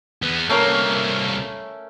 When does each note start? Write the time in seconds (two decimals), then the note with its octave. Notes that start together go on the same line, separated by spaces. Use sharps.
0.22 E2 B3
0.49 C2 A3 A#3 C#4 A#4